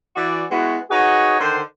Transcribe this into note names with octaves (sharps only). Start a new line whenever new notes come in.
E3 F#4 D5
G#3 B3 E4 F#4
D#4 F#4 G#4 B4 C#5 D#5
D3 D#3 C5